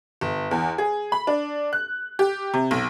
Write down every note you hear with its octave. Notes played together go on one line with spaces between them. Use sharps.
G1
E2
G#4
B5
D4
F#6
G4
C3
B1